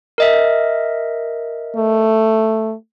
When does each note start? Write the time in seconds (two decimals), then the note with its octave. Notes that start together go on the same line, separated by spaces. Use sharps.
0.18 A#4 D#5 E5
1.76 A3